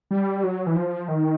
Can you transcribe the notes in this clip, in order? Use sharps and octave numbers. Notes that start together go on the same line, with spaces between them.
G3
F#3
E3
F3
D#3